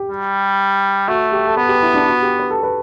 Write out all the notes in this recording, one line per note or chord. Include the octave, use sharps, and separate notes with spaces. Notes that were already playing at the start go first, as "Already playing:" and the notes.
Already playing: G4
G3
A3 F#4
G4
A4
B3 B4
G4
E4
D4
F#4
G4
B4
A4
B4